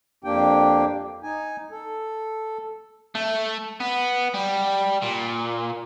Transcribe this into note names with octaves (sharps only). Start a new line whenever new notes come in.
F2 A#3 D4 G4 G5
D#4 G#5
A4
A3
B3
G3
A#2